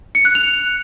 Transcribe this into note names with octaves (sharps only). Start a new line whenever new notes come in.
C#7
F#6
F7